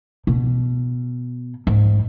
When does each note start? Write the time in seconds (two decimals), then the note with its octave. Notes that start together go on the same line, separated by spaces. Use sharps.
0.27 B2
1.67 G#2